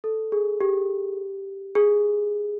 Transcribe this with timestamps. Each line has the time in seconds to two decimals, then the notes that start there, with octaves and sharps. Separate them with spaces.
0.04 A4
0.32 G#4
0.60 G4
1.75 G#4